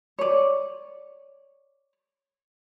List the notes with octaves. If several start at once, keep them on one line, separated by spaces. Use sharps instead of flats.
C#5 D5